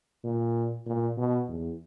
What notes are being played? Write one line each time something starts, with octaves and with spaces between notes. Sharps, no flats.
A#2
A#2
B2
E2